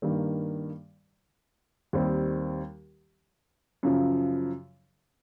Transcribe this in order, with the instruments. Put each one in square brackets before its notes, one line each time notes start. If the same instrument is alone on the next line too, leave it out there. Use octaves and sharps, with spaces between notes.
[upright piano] G2 D#3 G3 A#3
D#2 D#3 G3 C4
F#2 C#3 F3